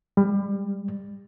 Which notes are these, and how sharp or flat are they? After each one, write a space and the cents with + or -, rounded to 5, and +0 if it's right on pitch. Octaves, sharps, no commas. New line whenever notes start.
G3 +25